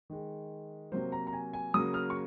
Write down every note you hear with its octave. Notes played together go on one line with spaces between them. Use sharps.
D#3 G#3
C3 F#3 A#3 C5
A#5
A#5
G#5
G#5
C#3 F#3 A#3 D#6
F6
C#6